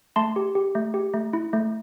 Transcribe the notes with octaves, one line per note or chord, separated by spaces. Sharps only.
A3 A5 C6
G4
G4
A3
G4
A3
E4
A3